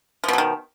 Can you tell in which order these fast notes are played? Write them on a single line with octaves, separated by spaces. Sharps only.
F3 B2 F#3 D#3